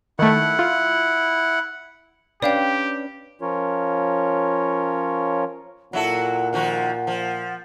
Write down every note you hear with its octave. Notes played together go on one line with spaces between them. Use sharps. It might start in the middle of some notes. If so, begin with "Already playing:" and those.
D#3 A3 E4 F#5
F4
C#4 D4 G4 B4 D5 F5 G5
F3 C#4 F4 A#4 C#5
A#2 F#3 E4 A4 F#5
D#3 F3 F#4
F3